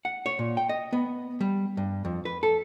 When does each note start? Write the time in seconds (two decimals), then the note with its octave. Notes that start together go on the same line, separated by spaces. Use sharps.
0.05 F#5
0.26 C#5
0.39 A#2
0.57 G5
0.69 D#5
0.93 B3
1.41 G3
1.77 G2
2.05 F2
2.25 B4
2.43 A4